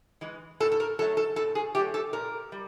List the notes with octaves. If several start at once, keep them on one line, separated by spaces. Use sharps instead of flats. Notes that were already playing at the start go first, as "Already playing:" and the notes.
E3 G#3
A2 A4
A4
A#4
F#3 A3 A4
A4
A2 A4
G#4
F#3 A3 G4
A4
A#2 A#4
G3